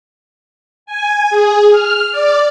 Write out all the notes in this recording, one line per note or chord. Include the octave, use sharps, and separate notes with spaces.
G#5
G#4
F6
D5